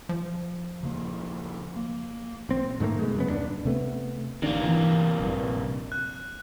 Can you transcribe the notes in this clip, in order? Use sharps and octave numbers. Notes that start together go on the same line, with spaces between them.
F3
D#1 C#3 A#3
A#3
A#1 C4
G#2 D#3 A3 A#3
B2 G#3
F#2 C#3 B3
D#1 D#2 D4
C3 A3 B3
A1 C3 D#3 A#3 D4
E3
A#1 G2
F#6